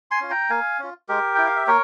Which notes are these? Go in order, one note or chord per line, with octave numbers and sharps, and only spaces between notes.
G#5 C6
C#4 F4
G5 A#5
A#3 F5 G#5
C#4 F4
G#3 G4 A#4
E4 G5
F5
E5
A#3 A#4 C#5